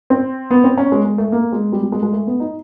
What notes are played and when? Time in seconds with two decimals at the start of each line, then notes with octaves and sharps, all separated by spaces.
0.10 C4
0.51 B3
0.64 C4
0.78 C#4
0.92 G#3
1.05 G#3
1.18 A3
1.32 A#3
1.52 G#3
1.72 G3
1.83 G3
1.92 G#3
2.03 G#3
2.13 A3
2.27 B3
2.40 D#4